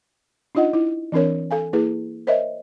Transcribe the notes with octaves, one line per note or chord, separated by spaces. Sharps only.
D4 D#4 F4 D#5 F#5
E4
E3 C4 D4 A#4 C#5
A4 F5 G#5
A#3 E4 G#4 B4
A#4 C5 C#5 D#5 E5